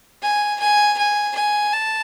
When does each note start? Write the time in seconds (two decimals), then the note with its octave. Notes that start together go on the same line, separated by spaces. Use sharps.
0.23 G#5
0.60 G#5
0.98 G#5
1.35 G#5
1.73 A5